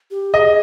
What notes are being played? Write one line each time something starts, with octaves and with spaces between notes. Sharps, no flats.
G4
G#4 D#5